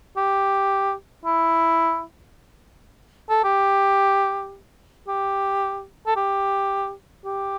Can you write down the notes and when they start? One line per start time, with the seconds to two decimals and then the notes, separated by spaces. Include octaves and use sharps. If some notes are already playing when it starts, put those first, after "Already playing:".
0.17 G4
1.25 E4
3.30 A4
3.44 G4
5.08 G4
6.07 A4
6.16 G4
7.25 G4